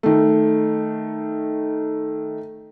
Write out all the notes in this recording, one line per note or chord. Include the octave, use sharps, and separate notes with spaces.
D#3 A3